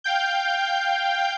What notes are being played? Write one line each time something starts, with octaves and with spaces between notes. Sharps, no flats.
F5 G5 G6